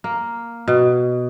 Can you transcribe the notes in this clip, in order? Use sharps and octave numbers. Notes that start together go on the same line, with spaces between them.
A#3
B2